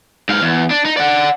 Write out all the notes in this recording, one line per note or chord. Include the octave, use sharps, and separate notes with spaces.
G#2 F5
E2
D4
D#4
D5 F#5